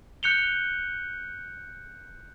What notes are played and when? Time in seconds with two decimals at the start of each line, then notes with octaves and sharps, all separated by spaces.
0.23 F#6 G6 C#7 F7 G7